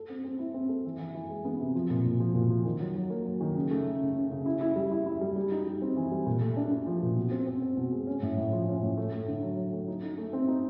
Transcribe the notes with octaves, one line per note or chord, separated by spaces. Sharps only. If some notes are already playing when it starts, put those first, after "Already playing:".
Already playing: A4
C4
C4
E4
C4
A4
E3
E3
E3
G#3
B3
C3
F3
A#2
A#2
F3
A#2
F3
D#3
F#3
F#3
A#3
F#3
D#3
C#3
A3
C#3
C#3
C#3
C#3
E4
E4
G3
E4
E4
G3
G3
D#4
G3
C4
E3
G3
A#2
A3
D4
D4
F3
A#2
B2
C4
C4
C4
B2
G#3
C#4
A2
A2
F3
C#4
A2
A3
A3
D3
F#3
F#3
A3
D#4
D#4
A3
C4
D#4